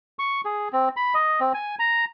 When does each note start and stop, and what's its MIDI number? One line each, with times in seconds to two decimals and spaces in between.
0.19 0.41 85
0.45 0.68 68
0.73 0.89 60
0.97 1.14 83
1.14 1.40 75
1.40 1.52 60
1.54 1.75 80
1.79 2.05 82